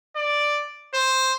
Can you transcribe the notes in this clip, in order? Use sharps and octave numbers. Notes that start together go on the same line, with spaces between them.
D5
C5